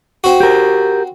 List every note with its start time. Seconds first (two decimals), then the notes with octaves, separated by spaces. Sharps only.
0.24 C4 F#4
0.40 G4 A#4